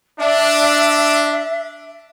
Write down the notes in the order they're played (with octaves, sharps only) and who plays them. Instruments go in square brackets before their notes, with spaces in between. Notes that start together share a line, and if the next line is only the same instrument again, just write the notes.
[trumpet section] D4 [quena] E5